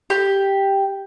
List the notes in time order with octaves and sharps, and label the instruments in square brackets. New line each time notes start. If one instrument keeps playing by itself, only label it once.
[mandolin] G4